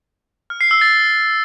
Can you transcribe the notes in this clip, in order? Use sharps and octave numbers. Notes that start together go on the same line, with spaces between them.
F6
C7
E6
A6